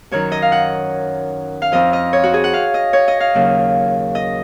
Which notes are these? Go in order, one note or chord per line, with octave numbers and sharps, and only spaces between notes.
F#2 D#3 F#3 C#5
D#5
F5
F#5
F5
F2 F3 D#5
D#5
C#5
F#4
G#4
F#5
F5
D#5
C#5
D#5
F5
D#2 C#3 F#3
D#5